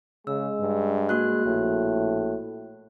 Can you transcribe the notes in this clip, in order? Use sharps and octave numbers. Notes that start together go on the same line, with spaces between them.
C#3 G#3 E6
G2
A#3 F#4 F#6
A#1 A2